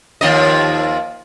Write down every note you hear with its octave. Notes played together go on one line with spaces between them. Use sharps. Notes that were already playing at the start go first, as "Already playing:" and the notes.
D#2 F3 D#5